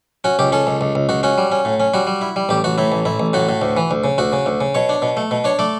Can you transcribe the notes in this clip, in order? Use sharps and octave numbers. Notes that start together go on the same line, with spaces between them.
C#4 F#4
C#2 G4
C#4 A4
C#2
C#2
C#2
C#2 F#4
C#4 F#4
G3
C#4
A2
C#4
G3 F#4
G3
E4
G3
A1 G4
A1 F#4
A2 E4
A1
A1 E4
A1
A2 F#4
A2
D2
E3
D2
C#3
D2 F#4
C#3
D2
C#3
B2 C#5
D4
B2
A3
B2
D4 C#5
A3 D5